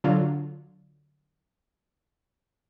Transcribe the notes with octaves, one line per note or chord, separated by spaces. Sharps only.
D3 F#3 F4